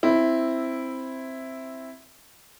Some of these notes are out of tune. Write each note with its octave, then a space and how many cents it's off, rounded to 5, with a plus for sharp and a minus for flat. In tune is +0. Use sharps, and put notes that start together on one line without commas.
C4 +5 E4 +0